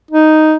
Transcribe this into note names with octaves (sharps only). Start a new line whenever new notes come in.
D#4